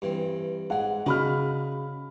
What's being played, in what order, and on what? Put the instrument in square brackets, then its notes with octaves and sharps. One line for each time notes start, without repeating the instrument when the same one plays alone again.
[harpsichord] G2 E3 C4
[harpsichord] G#2 G#4 [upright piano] F#5
[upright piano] C#3 B5 F6 [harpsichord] D4 D#4 F#4